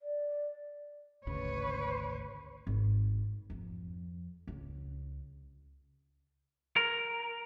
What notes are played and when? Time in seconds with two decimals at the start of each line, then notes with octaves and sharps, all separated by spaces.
0.01 D5
1.27 G#1 D2 C#3 B4 C#5
2.67 G#1
3.50 F2
4.47 C#2
6.76 A#4